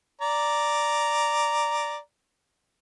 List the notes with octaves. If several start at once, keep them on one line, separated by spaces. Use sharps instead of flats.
D5 A#5